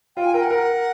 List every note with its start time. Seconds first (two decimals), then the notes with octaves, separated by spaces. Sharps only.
0.16 F4 G5
0.25 G#5
0.34 A#4 G5
0.42 F#5
0.50 A#4